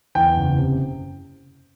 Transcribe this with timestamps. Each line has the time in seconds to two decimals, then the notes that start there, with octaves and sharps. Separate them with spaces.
0.15 E2 G5
0.36 F#1
0.58 C3